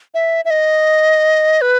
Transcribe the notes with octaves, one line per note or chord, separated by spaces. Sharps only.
E5
E5
D#5
B4